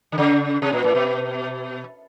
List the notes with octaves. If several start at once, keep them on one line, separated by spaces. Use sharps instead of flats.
D3
C#3
C3
A#2
A2
B2